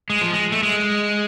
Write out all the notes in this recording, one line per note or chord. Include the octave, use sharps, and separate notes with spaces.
G#3
F3
G#3
A3
G#3